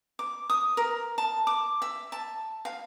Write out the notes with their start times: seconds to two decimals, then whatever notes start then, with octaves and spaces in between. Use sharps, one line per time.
0.19 D6
0.50 D#6
0.77 A#4
1.18 A5
1.47 D6
1.82 E5
2.12 A5
2.65 F5